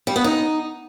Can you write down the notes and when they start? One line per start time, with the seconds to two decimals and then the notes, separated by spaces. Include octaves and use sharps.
0.07 G3
0.16 B3
0.24 D#4